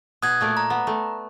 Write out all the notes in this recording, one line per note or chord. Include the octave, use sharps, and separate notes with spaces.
B2 D#6 F#6 G#6
A#2 A3 D5
A#5
B3
A3